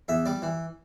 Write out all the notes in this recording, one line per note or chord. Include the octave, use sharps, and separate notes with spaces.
E2 E5
G3 D5
E3